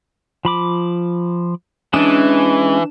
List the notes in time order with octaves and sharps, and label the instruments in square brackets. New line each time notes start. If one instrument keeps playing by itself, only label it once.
[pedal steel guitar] F3 B5 D6
[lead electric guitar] E3 [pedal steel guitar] G#3 C#4 D#6 [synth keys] D4 E7